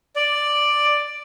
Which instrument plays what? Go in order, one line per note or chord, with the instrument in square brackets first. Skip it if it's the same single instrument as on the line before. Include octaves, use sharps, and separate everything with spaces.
[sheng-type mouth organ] D5